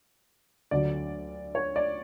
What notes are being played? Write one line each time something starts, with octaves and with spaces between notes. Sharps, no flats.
D2 D3 F#3 D5
C#5
D5